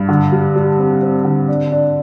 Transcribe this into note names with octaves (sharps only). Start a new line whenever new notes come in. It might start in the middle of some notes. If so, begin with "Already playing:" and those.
Already playing: G2
D3
G3
G3
C4
C4
D3
D4
D4